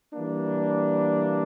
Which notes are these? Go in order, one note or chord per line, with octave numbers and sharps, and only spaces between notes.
E3 G3 A#3 D4